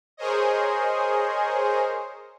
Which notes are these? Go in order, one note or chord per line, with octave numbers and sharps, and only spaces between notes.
G#4 A#4 C5 C#5 D#5